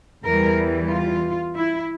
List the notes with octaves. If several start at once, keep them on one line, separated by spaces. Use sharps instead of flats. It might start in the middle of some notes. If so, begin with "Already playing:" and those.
E2 E3 G3 A#4
F4
E4